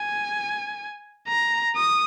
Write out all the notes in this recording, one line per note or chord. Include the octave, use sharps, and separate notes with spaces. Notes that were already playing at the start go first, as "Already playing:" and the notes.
Already playing: G#5
A#5
D#6